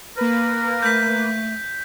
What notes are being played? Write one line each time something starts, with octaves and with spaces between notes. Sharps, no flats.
A#3 A#4 B4
A3 G6 B6